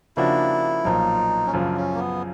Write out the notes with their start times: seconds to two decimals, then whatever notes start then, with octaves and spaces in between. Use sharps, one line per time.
0.17 C#3 F3 A#3 D4 E4 F#4
0.85 B1 A#2 F3 D#4
1.47 C#4
1.53 F#2 C#3 F3 D4
1.77 C#4
1.95 A#3
1.99 B3